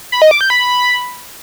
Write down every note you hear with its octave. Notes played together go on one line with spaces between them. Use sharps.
B5
D#5
D6
G6
B5